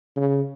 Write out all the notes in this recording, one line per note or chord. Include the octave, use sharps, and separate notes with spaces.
C#3